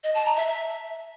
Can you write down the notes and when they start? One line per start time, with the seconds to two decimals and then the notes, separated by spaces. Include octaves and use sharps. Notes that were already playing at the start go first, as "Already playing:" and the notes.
0.04 D#5
0.15 A5
0.25 A#5
0.36 E5
0.47 E5